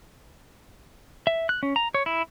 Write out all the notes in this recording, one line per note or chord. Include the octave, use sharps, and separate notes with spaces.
E5
F#6
C#4
A#5
C#5
E4